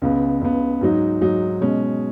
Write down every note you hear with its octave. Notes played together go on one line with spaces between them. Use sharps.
C#2 C#3 B3
C#2 C#3 B3
G#2 F#3 D#4
G#2 F#3 D#4
B2 G#3 C#4